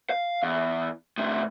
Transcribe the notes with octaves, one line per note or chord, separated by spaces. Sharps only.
F5
E2
A2 C4